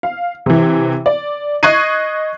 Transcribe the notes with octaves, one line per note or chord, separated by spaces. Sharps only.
F5
C3 E3
D5
D#5 C#6 F#6 G#6 C7 D#7